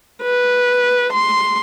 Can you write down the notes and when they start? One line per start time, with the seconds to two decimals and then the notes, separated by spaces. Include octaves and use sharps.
0.23 B4
1.13 C6